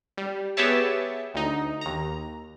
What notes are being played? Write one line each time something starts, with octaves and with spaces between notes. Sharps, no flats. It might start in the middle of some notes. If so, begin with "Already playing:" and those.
G3
B3 G4 G#4 C#5 E5 A5
D2 D#4
D#2 A#5